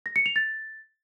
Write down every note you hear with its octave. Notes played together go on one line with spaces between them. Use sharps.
A#6
C#7
F7
A6